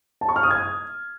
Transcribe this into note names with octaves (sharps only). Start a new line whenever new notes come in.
A5
C#6
F6
D#6
G#6